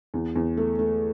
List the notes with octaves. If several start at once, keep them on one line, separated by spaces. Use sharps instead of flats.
E2
E2
A3
A3